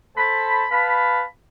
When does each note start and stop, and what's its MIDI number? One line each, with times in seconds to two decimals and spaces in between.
0.17 0.65 69
0.17 0.65 72
0.17 0.65 81
0.17 0.65 83
0.70 1.23 71
0.70 1.23 77
0.70 1.23 81
0.70 1.23 83